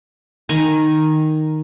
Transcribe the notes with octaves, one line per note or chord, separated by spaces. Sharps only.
D#3 G#5 A#5